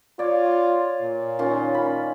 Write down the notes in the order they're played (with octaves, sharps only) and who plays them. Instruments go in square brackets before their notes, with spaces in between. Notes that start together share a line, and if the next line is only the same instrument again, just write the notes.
[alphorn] F4 [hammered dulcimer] C#5 D5
[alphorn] A#2
[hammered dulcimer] D#3 C#4 F4
B5